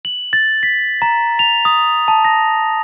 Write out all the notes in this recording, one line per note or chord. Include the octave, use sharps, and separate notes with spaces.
F#7
A6
B6
A#5
F7
D#6
A5
A#6